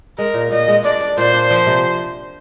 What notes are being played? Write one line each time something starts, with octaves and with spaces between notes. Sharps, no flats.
G#3 A#4
A#2
A#2 D#5
G#3
D4 D5
D4
A#2 C5
D4
F3
C3